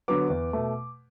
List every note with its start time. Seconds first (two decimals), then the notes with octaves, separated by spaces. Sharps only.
0.08 D3 F#3 B3 D6
0.30 E2
0.53 B2 A3